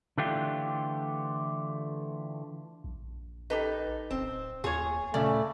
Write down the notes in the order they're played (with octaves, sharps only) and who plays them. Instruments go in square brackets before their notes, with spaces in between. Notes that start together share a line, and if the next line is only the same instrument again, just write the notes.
[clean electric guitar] D3 E3 A3 D4 F4 G4
[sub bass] A#1
[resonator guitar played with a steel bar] D#4 [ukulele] G4 A4 B4
[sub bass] D1 [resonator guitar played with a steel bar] C4
[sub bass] D#2 [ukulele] F4 C#5 [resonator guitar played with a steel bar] G#4
[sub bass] A#2 [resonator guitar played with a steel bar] C#3 [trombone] A3 [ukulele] D5